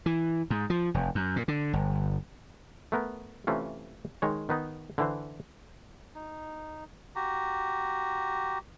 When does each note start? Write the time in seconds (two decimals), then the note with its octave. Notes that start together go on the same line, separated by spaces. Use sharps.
0.06 E3
0.50 G#2
0.70 F3
0.94 F1
1.15 F#2
1.36 A#2
1.48 D3
1.73 G1
2.92 A3 B3 A#4
3.47 C3 E3 A3 C#4 F4
4.22 D#3 G#3 C#5
4.49 D#3 B3 D#4
4.98 D3 E3 C5
6.15 D#4
7.16 F#4 G4 A#5